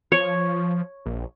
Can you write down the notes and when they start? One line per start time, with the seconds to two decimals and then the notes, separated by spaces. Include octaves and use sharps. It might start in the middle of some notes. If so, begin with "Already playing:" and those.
0.12 F3 C#5
1.06 A#1